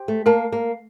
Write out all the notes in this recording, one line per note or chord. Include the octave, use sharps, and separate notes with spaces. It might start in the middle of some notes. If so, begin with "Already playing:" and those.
Already playing: G4 C5
A3
A#3 A#4 F5 A5
A#3